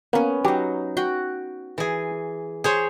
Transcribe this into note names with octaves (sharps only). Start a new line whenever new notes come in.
A#3 B3 C#4
F#3 D#4 G4
F#4 G5
E3 G#4
G#4 C5 C#5